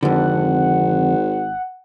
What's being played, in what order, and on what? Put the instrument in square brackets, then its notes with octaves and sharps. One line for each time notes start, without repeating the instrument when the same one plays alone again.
[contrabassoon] G#1 [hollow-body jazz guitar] F2 D3 [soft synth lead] F#5